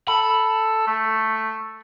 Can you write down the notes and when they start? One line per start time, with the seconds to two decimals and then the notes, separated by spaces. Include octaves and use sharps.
0.08 A4 B5
0.87 A3